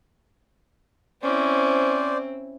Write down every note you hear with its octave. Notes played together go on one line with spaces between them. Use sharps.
C4 C#4 E4 C5 D5